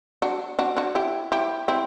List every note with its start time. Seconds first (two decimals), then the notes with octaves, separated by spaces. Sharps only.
0.22 D4 F#4
0.59 D4 F#4
0.77 D4 F#4
0.95 E4 G4
1.32 E4 G4
1.68 C4 E4